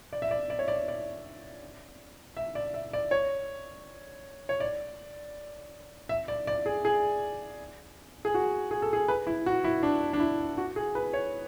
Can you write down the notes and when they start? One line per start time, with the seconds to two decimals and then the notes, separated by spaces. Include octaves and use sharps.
0.13 D5
0.22 E5
0.31 D5
0.50 D5
0.59 C#5
0.68 D5
0.88 D5
2.37 E5
2.55 D5
2.74 E5
2.93 D5
3.11 C#5
4.49 C#5
4.60 D5
6.09 E5
6.28 D5
6.47 D5
6.66 G#4
6.85 G#4
8.25 G#4
8.34 F#4
8.71 G#4
8.82 A4
8.93 G#4
9.08 B4
9.27 E4
9.46 F#4
9.64 E4
9.83 D4
10.13 D4
10.20 E4
10.58 F#4
10.76 G#4
10.95 B4
11.14 C#5